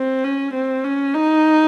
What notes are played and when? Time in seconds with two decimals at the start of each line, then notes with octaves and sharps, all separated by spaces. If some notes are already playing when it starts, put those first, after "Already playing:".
Already playing: C4
0.24 C#4
0.54 C4
0.84 C#4
1.14 D#4